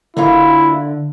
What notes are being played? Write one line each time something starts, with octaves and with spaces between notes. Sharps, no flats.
D3 F#3 A#3 E4 F4